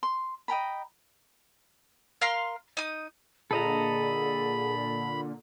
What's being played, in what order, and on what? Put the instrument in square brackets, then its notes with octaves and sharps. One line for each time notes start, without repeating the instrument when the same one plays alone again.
[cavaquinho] C6
D#5 G5 A#5 B5
[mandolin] A#4 F5 C6 F6
D#4 D#6
[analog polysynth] A#2 D3 [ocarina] G#4 [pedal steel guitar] A4 D#5 A#5 [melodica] B5